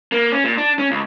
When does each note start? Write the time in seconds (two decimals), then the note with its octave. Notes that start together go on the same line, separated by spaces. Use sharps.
0.12 A#3
0.32 C#4
0.44 A#2
0.57 D4
0.79 C#4
0.91 C#2